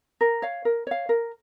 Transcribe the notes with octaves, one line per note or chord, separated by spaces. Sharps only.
A#4
C#5 F5
A#4
C#5 F5
A#4